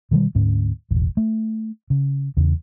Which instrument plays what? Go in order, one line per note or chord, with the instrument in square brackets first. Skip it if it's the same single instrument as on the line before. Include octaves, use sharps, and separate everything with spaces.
[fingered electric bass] B2 D#3 E3 G3
D2 G#2 C#4
E1 A1 E2
A3
C#3
E2 C#3